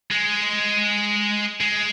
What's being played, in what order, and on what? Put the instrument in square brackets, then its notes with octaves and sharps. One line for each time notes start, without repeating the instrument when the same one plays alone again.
[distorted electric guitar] G#3
G#3